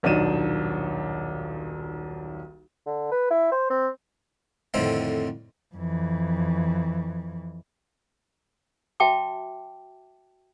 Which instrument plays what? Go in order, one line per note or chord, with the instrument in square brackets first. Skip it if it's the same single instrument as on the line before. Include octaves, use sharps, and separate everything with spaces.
[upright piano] D#1 B1 D4 D#4 D#7 E7
[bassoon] D3
B4
E4
C5
C4
[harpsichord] F2 A2 D3 D#3 C4
[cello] F2 E3
[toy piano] F#4 E5 G5 A5 D6